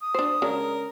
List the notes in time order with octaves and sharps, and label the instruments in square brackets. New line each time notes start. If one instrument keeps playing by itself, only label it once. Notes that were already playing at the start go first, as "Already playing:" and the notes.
[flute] D#6
[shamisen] D4 C5
[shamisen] C#3 G#3 D4 [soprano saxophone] A#4